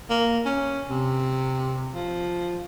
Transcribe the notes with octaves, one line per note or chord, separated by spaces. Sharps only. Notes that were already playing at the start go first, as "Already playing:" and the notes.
A#3
C#4
C3
F3